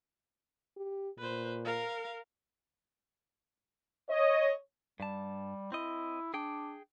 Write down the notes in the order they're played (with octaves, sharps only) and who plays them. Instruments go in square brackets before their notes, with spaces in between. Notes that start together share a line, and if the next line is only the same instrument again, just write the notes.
[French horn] G4
[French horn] A#2 [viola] B4 C5
[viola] A#4 F5
[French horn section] C#5 D#5
[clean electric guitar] G2 A5 [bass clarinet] G3
[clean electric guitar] C4 D#5 [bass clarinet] E4
[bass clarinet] D4 [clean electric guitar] G#4 G5